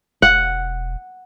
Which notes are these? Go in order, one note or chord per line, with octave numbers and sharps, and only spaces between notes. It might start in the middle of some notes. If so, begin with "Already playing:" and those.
E1 F#5